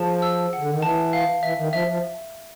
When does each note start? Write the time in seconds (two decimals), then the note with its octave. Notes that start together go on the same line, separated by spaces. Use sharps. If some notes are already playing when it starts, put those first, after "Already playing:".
Already playing: F3 G#4 A5
0.22 E6
0.53 F#5
0.58 D3
0.71 D#3
0.82 E3 A5
1.13 F5
1.43 E3 E5
1.58 D#3
1.73 F3 E5
1.88 F3